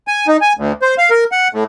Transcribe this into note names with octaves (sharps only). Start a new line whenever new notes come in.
G#5
D#4
G#5
D2
C5
F5
A#4
F#5
A2